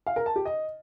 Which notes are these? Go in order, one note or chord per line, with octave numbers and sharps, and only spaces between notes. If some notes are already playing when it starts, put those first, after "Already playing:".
F5
A#4
A5
G4
D#5